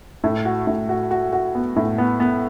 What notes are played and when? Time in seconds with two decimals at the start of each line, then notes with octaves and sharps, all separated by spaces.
0.24 A2
0.45 F#4
0.67 A2
0.89 F#4
1.11 F#4
1.33 F#4
1.55 B3
1.76 A2
1.98 B3
2.20 B3